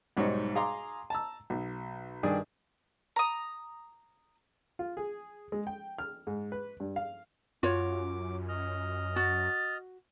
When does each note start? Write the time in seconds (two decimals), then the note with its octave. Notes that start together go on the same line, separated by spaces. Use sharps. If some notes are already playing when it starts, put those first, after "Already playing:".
0.17 B1 G#2 G3 D#4 C#5 D#5
0.55 G#4 F5 A#5 C6 D6
1.10 A5 A#5 E6
1.50 B1
2.23 G2 D#3 D4 G#4 D5
3.16 A#5 D#6
4.79 F4
4.97 G#4
5.52 G#3
5.67 G5
5.99 F6
6.27 G#2
6.52 B4
6.80 G2
6.96 F5
7.63 F#2 F4 F#4 C#5 D6
8.49 D#5 F6
9.16 F#4 A6